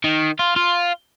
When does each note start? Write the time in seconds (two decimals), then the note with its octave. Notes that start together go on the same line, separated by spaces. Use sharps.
0.04 D#3
0.39 F4
0.56 F4